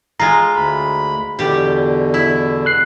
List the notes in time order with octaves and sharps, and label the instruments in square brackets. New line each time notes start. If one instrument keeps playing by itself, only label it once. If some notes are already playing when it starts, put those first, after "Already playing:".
[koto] G#3 F4 [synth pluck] A#5
[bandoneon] D2 B5
[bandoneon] E2 B2 D3 [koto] G3 G4
[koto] E4
[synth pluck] F#6 C7